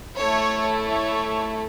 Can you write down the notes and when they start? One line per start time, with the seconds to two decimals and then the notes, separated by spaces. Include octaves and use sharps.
0.17 A3 E4 A4 C#5
0.89 C#5